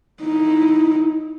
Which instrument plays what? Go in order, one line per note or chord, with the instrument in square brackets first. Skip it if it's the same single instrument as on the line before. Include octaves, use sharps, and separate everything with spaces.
[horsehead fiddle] D#4 E4